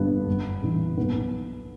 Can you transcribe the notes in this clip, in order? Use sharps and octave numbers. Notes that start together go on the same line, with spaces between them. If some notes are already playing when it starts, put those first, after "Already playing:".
Already playing: G1 G2 D3 B3
G1
G2 E3
B1 B3